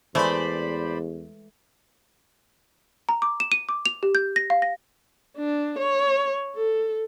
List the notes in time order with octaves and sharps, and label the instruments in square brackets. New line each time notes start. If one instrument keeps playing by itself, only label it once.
[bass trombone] E2 [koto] E3 G#3 A3 [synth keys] C5 D5 B5
[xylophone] A#5
D6
E7
D#7
D6
F7
G4
G6
A#6
F5
A#6
[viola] D4
C#5
A4